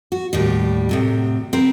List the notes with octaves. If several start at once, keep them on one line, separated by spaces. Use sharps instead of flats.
F#4
D#2 A2 G3
A2 C3 F#3
C4 A#4 B4